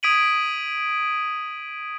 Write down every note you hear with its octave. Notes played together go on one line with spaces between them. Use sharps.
D#6 G#6 B6 D7 D#7 F#7